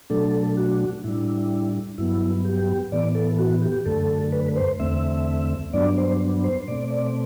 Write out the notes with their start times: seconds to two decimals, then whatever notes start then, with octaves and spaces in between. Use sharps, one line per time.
0.10 B2 F#3 A3 D4 A4
0.57 F#4
1.04 A2 G3 D4 E4
1.98 G2 F#3 B3 E4
2.45 G4
2.92 A2 E3 B3 D5
3.15 A4
3.39 F#4
3.62 G4
3.86 F#2 D3 A3 A4
4.32 B4
4.56 C5
4.80 E2 D3 A3 C4 E5
5.73 G2 F#3 B3 D4 D5
5.98 C5
6.44 C5
6.67 B2 A3 C4 D5
6.91 D5